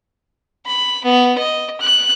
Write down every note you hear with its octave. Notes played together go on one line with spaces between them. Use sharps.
B5
B3
D#5
F#6